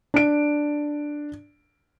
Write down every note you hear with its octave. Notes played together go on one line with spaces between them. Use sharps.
D4 D7